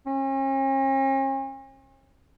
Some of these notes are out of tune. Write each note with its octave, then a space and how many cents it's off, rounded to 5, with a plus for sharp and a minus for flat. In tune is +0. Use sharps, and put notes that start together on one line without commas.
C#4 -45